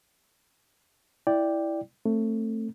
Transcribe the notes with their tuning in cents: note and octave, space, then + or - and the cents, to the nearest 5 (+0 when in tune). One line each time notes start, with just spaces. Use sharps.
E4 +0 D5 +0 G5 +0
A3 +20 C4 +40